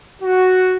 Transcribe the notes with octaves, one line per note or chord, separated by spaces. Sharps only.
F#4